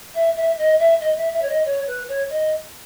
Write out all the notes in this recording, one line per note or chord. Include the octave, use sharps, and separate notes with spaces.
E5
E5
D#5
E5
D#5
E5
E5
C#5
D#5
C#5
B4
C#5
D#5